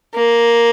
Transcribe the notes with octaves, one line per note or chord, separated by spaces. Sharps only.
A#3